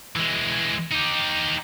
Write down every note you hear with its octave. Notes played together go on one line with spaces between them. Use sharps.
E3 G#3
D#4 G4